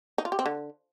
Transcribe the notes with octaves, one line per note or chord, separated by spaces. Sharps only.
D#4
F4
G4
C4
D3